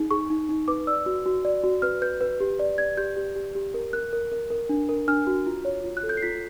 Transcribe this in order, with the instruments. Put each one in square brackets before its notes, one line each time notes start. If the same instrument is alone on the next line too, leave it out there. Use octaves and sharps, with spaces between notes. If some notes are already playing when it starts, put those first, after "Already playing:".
Already playing: [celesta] D#4 G#4
G#4 C#6
D#4
D#4
B4 D6
D5 E6
F#4
F#4
D5
F#4
B4 F6
B4 G6
B4
G4
D5
D5 G#6
G4 G6
G4
G4
G4
A#4
A#4 F#6
A#4
A#4
A#4
D4
A#4
D4 F6
F#4
F4
C#5
F4
F#6
A4
G6
C7
F4 B6